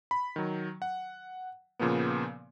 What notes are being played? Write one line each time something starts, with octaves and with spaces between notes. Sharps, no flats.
B5
D#3 F#3
F#5
A#2 C#3 F3 A#3 B3